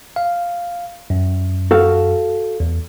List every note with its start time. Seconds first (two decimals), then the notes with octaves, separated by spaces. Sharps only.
0.16 F5
1.10 F#2
1.71 F#4 A4 F5
2.60 E2